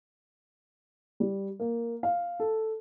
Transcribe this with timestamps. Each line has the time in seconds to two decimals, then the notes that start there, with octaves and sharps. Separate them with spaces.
1.20 G3
1.60 A#3
2.03 F5
2.40 A4